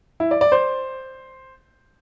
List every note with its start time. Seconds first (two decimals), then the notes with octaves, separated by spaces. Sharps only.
0.20 E4
0.31 D5
0.41 D5
0.52 C5